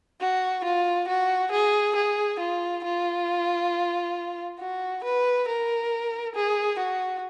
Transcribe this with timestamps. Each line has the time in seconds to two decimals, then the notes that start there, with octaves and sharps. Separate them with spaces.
0.21 F#4
0.65 F4
1.08 F#4
1.52 G#4
1.96 G#4
2.40 F4
2.84 F4
4.59 F#4
5.04 B4
5.48 A#4
6.35 G#4
6.79 F#4